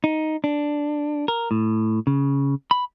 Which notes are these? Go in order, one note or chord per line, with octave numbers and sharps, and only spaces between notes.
D#4
D4
A#4
A2
C#3
B5